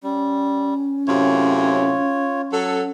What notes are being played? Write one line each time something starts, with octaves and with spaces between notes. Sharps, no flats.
G3 C#4
F#2 A2 C3 F4 C#5
F#3 A4